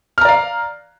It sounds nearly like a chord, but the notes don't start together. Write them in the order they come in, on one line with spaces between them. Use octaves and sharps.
F6 A#5 D5 F5